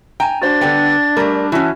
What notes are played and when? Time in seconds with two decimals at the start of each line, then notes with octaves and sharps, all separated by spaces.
0.20 G5 G#5 A#5
0.42 D4 F#4 C5 A6
0.61 D3 G3 B3 G5
1.17 G3 A3 A#4
1.52 E3 C#4 E4 F#4 A5